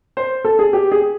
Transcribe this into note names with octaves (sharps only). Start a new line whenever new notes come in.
C5
A4
G#4
G4
G#4